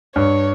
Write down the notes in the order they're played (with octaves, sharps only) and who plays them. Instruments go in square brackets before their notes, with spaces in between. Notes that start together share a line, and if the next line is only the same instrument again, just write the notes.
[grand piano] G2 [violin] C#5